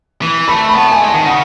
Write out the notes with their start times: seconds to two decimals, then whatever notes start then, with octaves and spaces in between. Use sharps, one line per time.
0.22 E3
0.48 A3 B5
0.69 B5
0.74 B3 A5
0.87 A3 G#5
1.01 G#3
1.10 D#3 A5
1.26 C#3 F#5